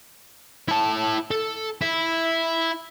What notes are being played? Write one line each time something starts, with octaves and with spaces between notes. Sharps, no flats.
E4 A5
A4
E4